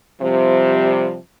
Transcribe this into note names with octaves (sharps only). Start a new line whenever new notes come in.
C3 F3 G3